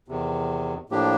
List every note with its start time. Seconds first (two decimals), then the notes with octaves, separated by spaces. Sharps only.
0.08 E2 C3 D#3
0.90 A2 F3 A#3 D4 G4